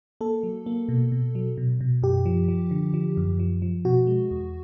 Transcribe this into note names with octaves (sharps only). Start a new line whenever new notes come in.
A#3 A4
F#3
A#3
B2
B2
F#3
B2
B2
F#2 G4
F3
F3
D3
F3
F#2
F3
F3
B2 F#4
G#3
E2